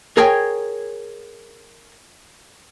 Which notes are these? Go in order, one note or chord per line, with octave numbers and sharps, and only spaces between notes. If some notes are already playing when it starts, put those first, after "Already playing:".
G#4 A#4 C#5 G5 G#5